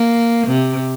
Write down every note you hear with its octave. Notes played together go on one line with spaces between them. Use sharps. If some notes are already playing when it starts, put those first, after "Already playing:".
Already playing: A#3
C3